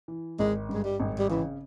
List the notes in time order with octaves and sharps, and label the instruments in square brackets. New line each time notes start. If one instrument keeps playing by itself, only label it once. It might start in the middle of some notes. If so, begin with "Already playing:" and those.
[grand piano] E3
[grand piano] G#1 [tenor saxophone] G#3
[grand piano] G2 [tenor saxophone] G#3
[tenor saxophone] G3
[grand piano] G#1
[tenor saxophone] G3
[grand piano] C#3 [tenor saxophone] E3